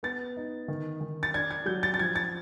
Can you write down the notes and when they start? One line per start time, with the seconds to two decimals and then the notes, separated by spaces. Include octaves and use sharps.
0.03 B3 A6
0.37 D#4
0.68 D#3
1.01 D#3
1.23 A6
1.34 D4 G#6
1.51 G#6
1.66 F#3 G6
1.83 A6
1.94 A6
1.98 F3 G#6
2.16 A6